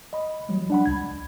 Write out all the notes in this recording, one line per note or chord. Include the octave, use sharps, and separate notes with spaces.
D#5 B5
E3 F#3 G3
D4 F#5 B5
C#2 G#6